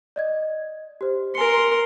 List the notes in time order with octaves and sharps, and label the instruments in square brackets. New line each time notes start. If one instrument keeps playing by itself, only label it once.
[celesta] D5 D#5 G#6
G4 C5
[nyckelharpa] A#4 C6 [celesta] G#5 C#7